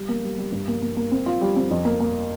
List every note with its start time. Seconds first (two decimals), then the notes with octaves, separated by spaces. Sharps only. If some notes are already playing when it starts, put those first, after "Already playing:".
Already playing: G3
0.09 A#3
0.23 G3
0.38 G3
0.52 G2
0.68 A#3
0.82 A#3
0.97 A#3
1.11 C4
1.26 F4
1.41 G3
1.56 C4
1.71 F2
1.85 A#3
2.00 A#3